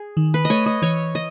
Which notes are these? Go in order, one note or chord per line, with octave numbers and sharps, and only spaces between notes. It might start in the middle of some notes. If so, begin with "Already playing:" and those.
Already playing: G#4
D#3
B4
D#5
A3 C#5
D#5
E3 C#5
D#5